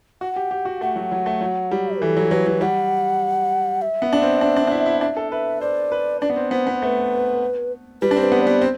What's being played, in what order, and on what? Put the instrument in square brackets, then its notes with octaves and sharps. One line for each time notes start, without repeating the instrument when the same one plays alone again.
[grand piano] F#4 [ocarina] F#5
[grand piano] G4
G4
F#4
[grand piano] A3 [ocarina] F#5
[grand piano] F#3
F#3
A3
F#3
G3
[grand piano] E3 [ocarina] A4
[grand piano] F#3
[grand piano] F#3 [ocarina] B4
[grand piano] F#3
[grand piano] G3 [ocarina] F#5
[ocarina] E5
[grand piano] B3
D4
C4
D4
D4
D4
E4
E4
[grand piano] D4 [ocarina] E5
[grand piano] A4
[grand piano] B4 [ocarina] E5
[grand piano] C5 [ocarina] D5
[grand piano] B4
[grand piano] D4 [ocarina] D5
[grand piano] B3
C4
[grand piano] B3 [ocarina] C5
[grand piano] B3
[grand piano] A3 [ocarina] B4 C5
[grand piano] G3 [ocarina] B4
[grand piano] D4
C4
[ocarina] B4
[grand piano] B3
[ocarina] D5
[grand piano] B3
C4